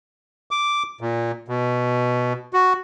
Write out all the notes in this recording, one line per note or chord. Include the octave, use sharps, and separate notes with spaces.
D6
A#2
B2
F#4